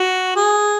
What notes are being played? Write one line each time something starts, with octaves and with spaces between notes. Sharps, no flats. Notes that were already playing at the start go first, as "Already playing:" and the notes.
Already playing: F#4
G#4